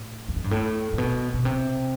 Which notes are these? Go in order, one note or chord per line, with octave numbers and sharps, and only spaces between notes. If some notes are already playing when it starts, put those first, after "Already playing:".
Already playing: A2
E2
F2
G2
A2
A2
B2
B2
C3